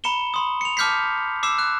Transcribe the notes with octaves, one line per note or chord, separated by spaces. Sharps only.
A#5 B5 C#7 E7 G7
B5 C6 D#6
C#7 F7
A5 D6 F6 G6 B6 C7
D6 E6 C7 E7
F#6